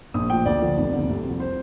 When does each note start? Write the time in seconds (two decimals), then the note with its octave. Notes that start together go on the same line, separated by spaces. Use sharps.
0.14 A#1 D#6
0.30 A2 F3 G5
0.45 D2 D5
0.61 D3 F3
0.77 F1
0.93 D#2 D3
1.09 C2
1.24 C3 F3
1.40 C5